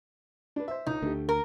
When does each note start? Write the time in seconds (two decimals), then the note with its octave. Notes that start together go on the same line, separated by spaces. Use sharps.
0.56 D4 B4
0.68 C5 E5
0.87 C#2 D#4
1.02 D2 A3 D4 G4
1.29 A#4